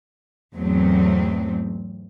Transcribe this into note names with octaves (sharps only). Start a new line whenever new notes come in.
E2 G#2 F#3 A3 C4